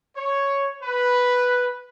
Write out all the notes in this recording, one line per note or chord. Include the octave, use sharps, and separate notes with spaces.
C#5
B4